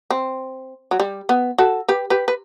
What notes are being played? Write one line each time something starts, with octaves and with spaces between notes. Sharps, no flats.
C4
F#3
G3
B3
F#4 A4
G4 B4
G4 B4
B4